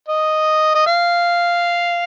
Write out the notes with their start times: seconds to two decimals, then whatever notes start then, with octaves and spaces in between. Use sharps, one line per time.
0.08 D#5
0.75 D#5
0.87 F5